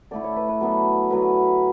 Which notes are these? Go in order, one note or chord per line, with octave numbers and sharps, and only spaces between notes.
D3 A3 E4 D5
C#5
B4
B4
F#3 B3 D4 A4
D3 F#3 B3 B4